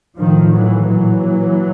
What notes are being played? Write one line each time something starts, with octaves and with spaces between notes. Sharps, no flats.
A2 D#3 F3
E3 F#3
A#2 E3 F#3